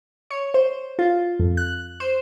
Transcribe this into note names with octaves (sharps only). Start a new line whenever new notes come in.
C#5
C5
F4
F2
F#6
C5